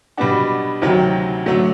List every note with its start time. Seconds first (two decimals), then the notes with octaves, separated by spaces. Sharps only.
0.17 B2 G3 B3 D4 F#4
0.81 D2 C3 D#3 F#3
1.46 D3 F#3 A3